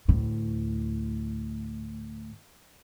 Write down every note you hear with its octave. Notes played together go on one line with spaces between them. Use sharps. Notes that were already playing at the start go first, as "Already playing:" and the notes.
D2 A2